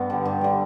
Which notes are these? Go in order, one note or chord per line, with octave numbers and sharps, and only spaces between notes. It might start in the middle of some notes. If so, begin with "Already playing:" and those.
Already playing: G2 B3
D3 G3
G2
D3 G3